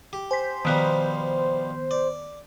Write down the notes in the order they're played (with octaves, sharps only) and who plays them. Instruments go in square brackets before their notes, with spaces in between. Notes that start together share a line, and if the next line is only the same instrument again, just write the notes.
[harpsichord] G4
[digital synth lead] C5 [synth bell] G#5 B6
[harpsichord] B2 F3 G3 [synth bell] D#3 B3
[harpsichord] D5